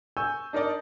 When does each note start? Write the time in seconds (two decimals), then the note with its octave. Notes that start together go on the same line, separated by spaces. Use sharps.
0.17 G#5 C#6 E6 G6
0.53 D4 D#4 A#4 D5 D#5